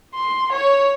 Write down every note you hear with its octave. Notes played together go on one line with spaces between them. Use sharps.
C6
C#5